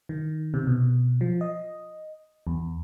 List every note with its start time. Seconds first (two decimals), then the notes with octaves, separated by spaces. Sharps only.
0.09 D#3
0.54 C3
0.67 B2
1.21 F3
1.41 D#5
2.47 E2